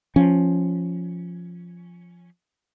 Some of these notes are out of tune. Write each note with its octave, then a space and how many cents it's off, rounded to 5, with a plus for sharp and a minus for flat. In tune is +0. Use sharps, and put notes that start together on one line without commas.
F3 +0 C#4 +0